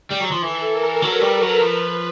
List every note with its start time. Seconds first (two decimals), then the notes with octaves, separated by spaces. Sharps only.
0.11 G3
0.21 F#3
0.32 F3
0.42 E3 A4
0.72 A#4
1.02 F#3 B4
1.21 G3
1.41 F#3
1.60 F3 B4